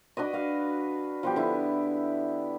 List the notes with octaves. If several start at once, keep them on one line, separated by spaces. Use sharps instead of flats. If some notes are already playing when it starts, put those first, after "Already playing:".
D4 F#4 B4 D#5
F#4 F5
F3 B3 G4
D3 E4